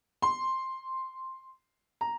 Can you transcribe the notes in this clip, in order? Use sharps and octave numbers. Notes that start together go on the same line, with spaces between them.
C6
A#5